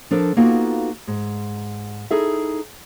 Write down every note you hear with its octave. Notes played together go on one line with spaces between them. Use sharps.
F3 D4 A4 A#4
A#3 B3 D#4 F4 F#4 A4
G#2
D#4 E4 G#4 A4 E5